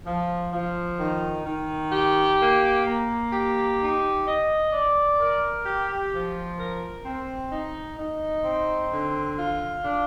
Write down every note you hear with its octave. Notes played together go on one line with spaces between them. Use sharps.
F3
F3
D#3
D#3
G4
A#3
A#3
G4
D#4
D#5
D5
A#4
G4
F3
A#4
C4
D#4
D#4
C4
D3
F4
D4